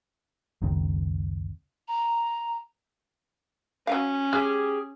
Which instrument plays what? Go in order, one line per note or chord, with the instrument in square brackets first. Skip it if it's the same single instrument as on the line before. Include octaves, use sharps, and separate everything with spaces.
[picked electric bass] F#1 C#2 D#3 C4
[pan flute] A#5
[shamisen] F#3 F5 [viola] C#4
[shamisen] G#3 [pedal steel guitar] G4 G#4 F6